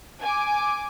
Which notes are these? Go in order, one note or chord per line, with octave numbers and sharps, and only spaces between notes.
G#5 D6